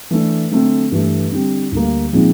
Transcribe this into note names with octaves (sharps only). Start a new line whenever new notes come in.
E3 A3 D4
D3 F#3 A3 C4
G2 E3 A3
D3 G3 C4
D2 D3 G3 A#3
A#2 F3 G#3 C4 D#4